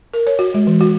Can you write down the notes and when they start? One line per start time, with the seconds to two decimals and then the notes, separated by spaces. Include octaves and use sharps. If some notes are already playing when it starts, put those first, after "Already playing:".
0.14 A#4
0.27 C#5
0.39 F#4
0.54 G#3
0.67 E3
0.81 F#4